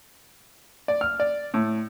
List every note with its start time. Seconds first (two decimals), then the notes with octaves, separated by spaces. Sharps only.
0.88 D5
1.01 F6
1.20 D5
1.54 A2